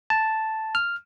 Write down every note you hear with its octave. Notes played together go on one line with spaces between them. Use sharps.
A5
F6